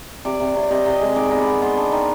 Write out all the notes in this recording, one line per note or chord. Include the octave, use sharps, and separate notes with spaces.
C3 D5
C3
C3 C#5
D5
C3 D#5
C3
D#5
G#3
D#3 D5
B3 D#5
D5
B3
B3 C5
D4
D#3